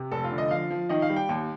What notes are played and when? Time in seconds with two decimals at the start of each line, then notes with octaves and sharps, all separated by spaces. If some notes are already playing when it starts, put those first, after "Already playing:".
Already playing: C3
0.12 F1 A4
0.24 F4
0.32 D3
0.38 D#5
0.51 F3 F5
0.71 F3
0.89 D#3 D#5
1.02 F5
1.10 G3
1.16 G5
1.29 D#2